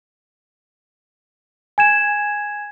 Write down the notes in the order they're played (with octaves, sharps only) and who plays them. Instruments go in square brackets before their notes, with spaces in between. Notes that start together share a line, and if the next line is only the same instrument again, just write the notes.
[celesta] G#5 G#6 E7